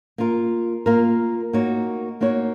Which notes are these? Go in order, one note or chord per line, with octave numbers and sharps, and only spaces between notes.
A#3 F4 A#4
A#3 F4 A#4
A#3 D#4 F#4 C#5
A#3 D#4 F#4 C#5